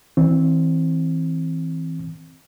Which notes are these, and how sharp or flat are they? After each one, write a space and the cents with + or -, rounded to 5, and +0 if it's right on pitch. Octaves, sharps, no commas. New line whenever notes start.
E3 -25 C4 +5